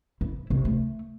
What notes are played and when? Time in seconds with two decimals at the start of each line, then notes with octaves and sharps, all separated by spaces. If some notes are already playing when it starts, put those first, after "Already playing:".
0.21 E4
0.50 C2
0.65 A3